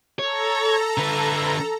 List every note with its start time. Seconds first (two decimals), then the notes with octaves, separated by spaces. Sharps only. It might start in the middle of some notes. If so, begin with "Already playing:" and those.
0.19 A4 C#5 A#5
0.98 D3 B4